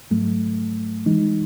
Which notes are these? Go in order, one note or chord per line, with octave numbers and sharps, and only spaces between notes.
G#2 F#3 A3
E3 G#3 D#4